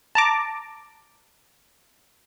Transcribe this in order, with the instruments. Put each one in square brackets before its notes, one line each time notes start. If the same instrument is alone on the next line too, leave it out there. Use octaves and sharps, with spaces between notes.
[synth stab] A5 A#5 D6